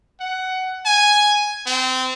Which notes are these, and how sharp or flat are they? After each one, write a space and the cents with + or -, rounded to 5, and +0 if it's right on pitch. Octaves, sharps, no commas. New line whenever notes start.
F#5 +15
G#5 +0
C4 -25